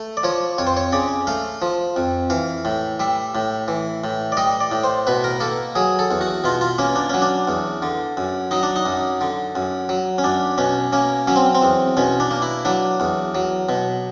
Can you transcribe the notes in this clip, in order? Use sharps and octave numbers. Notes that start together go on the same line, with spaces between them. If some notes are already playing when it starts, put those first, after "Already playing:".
Already playing: A3
D5
F3 C#5
F2 C#5
C5
C#5
C#3 D5
A3 F5
F3
F2
E3 F5
A2
G3 E5
A2
E3
A2
D5
G3 D#5
D5
A2
C5
B2 B4
A#4
A#3 A4
F#3 G#4
A4
E2
F#4
B2 F4
F4
A#3 C#4
D4
F#3 C#4
D4
E2
D3
F#2
F#3 D#4
D4
D#4
F#2
D3
F#2
F#3
C#4
F#2 D4
B2 C#4
A#3 C#4
F#3 C#4
C4
C4
E2
B2 C#4
D4
A#3
E4
F#3 D4
E2
F#3
B2